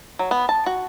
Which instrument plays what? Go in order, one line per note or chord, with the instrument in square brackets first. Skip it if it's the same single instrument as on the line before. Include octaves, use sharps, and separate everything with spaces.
[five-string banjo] F#3
B3
A5
F#4